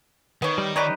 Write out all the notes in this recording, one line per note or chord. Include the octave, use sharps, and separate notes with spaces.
D#3 B3 C#5
G3
D#4 G4 B4 C#5 D5 A#5